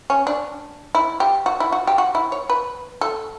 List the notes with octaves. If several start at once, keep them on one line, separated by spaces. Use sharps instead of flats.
C#4
D4
E4
G4
F#4
E4
F#4
G4
F#4
E4
C#5
B4
A4